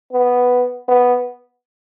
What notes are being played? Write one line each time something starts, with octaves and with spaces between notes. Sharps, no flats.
B3
B3